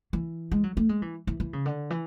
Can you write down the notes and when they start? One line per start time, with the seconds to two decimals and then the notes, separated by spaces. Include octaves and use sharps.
0.13 E3
0.51 G#3
0.64 F#3
0.77 A3
0.89 G#3
1.02 E3
1.27 E3
1.40 E3
1.53 C#3
1.66 D3
1.90 E3